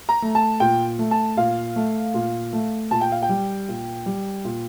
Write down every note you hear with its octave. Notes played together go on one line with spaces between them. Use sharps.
A#5
A3
A5
A#2 G5
A3
A5
A#2 F5
A3
A#2
A3
A#2 A5
G5
F5
G5
G3
A#2
G3
A#2